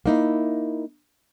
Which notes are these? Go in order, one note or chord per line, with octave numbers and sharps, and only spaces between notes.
A#3 D#4 E4